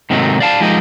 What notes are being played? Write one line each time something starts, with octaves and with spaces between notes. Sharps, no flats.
G#2 C3 D#3 F#3 A3 D#4
D5 F5 A5
F3 G#3 D#4 G4 A#4 D#5